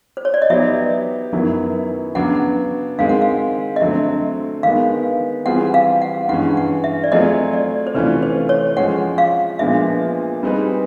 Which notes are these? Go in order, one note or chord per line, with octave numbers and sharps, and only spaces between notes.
C5
C#5
D5
D#5
F#3 B3 D#4 G4 C5 E5
F#2 D#3 F#3 B3 E4
C#3 F#3 B3 D4 F#5
D#3 G#3 C4 F5
F#5
F5
D#5
D3 F#3 A3 C4 E5
D#3 G#3 B3 F5
E3 G3 C4 F4 G#4 F#5
F5
F#5
G2 E3 G#3 C#4 F#5
F#5
E5
D5
F#3 A3 C4 F4 G#4 D#5
D5
C5
C3 E3 A3 C#4 F4 B4
C5
C#5
F3 G#3 C#4 F#5
F5
A#2 F3 G#3 B3 D4 E5
G3 C4 D#4 G#4 B4